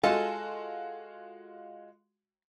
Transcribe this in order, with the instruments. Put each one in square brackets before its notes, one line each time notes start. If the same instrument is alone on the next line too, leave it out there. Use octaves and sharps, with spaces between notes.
[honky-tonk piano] G#3 F4 F#4 [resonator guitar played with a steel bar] A4 D#5 G#5 [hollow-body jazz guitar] F5